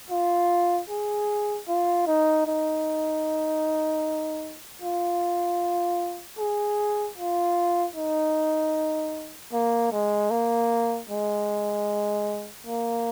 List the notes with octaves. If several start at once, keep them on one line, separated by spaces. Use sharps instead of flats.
F4
G#4
F4
D#4
D#4
F4
G#4
F4
D#4
A#3
G#3
A#3
G#3
A#3